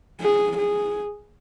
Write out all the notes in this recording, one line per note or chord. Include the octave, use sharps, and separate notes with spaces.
G#4
G#4